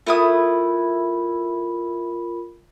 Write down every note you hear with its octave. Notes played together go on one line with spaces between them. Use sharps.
A3 E4 F4 A#4 B5 D#6